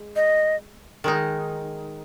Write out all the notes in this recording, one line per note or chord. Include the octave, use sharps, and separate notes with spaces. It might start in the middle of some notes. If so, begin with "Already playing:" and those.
Already playing: G#3
D#5
D#3 G#3 D#4